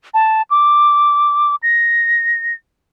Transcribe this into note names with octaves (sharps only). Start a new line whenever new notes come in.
A5
D6
A#6